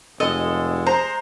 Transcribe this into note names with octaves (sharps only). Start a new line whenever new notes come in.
F1 G#3 A4 D#5
C5 A#5